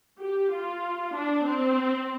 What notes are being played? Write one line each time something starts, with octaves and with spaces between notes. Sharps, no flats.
G4
F4
D4
C4